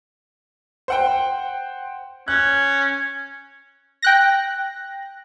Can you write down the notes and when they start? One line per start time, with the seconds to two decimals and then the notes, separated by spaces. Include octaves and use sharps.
0.88 C5 F#5 G5
2.28 C#4 F#6
4.02 G5 F#6 A#6